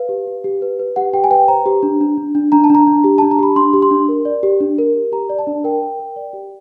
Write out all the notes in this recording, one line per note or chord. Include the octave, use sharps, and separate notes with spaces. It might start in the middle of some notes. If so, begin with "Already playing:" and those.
Already playing: B4 F5
G4
G4
G4
B4
B4
G4 F#5
G4 G5
G#5
B4 G5
C5 A#5
G4
D4
D4
D4
D4
D4 A#5
A5
D4 A#5
D4
G4
D4 A5
A#5
G4 B5
D4 C6
G4
C6
D4
A#4
D5
G4
D4
A#4
G4
G4 A#5
D5
A5
D4
A#4 G5
A#4
A#4
D5
G4